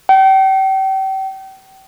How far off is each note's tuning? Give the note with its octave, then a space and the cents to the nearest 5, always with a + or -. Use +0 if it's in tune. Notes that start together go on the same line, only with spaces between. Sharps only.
G5 -35